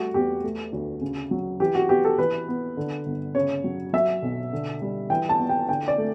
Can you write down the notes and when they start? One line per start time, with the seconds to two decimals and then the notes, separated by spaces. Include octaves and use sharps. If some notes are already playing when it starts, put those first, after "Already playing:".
Already playing: G3 A3 F#4
0.14 E2 G4
0.44 A3
0.73 D2
1.01 C#3
1.31 F#3
1.60 E3 G4
1.75 F#4
1.89 B3 G4
2.05 A4
2.18 E3 B4
2.48 B3
2.77 D3
3.06 G1
3.35 C#3 C#5
3.64 F#3
3.93 F#3 E5
4.23 B1
4.53 D3
4.82 G3
5.10 E3 G5
5.29 A5
5.39 B3
5.49 G5
5.69 D3 G5
5.88 D5
5.98 A3